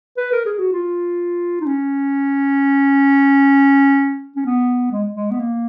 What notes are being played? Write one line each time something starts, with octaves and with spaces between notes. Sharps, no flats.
B4
A#4
G#4
F#4
F4
D#4
C#4
C#4
B3
G#3
G#3
B3
A#3